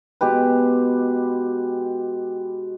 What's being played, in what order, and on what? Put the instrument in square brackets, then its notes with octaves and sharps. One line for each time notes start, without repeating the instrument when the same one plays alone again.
[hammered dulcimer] B2 G#3 G4 B4